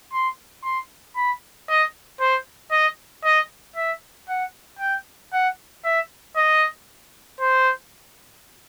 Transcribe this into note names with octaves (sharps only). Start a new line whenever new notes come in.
C6
C6
B5
D#5
C5
D#5
D#5
E5
F#5
G5
F#5
E5
D#5
C5